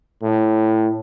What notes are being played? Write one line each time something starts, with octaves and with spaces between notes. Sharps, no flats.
A2